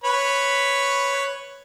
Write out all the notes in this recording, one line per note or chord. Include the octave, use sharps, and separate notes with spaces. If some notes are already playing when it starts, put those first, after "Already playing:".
B4 C#5 B5